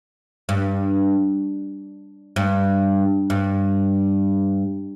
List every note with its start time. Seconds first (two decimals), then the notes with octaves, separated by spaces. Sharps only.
0.49 G2
2.36 G2
3.30 G2